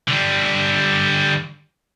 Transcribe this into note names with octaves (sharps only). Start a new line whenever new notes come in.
D3 G3